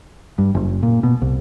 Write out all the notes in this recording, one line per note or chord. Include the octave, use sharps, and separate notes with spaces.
G2
F#1
A#2
B2
C2